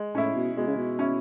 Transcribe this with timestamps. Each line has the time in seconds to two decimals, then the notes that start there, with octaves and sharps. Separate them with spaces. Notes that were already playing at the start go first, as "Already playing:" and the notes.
Already playing: G#3
0.15 A2 C#4 E4
0.36 B2
0.57 B2 G#3
0.67 C#3
0.77 B2
0.99 C#4 E4